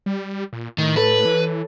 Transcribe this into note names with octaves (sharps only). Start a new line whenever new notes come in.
G3
A#2
A2 D#3
A4 B4 C#5
E3